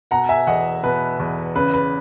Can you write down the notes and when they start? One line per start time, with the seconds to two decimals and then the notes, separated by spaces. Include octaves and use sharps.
0.11 B2 F#5 A#5
0.29 E5 G#5
0.47 E2 D#5 F#5
0.83 B2 B4
1.19 E2
1.56 C#3 B4
1.73 B4